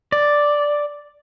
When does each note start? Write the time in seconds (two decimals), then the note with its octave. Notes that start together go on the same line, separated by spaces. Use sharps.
0.12 D5